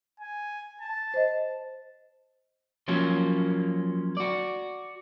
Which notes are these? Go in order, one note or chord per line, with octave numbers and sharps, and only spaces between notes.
G#5
A5
C5 D#5
F3 F#3 A#3 C#4
F#4 D5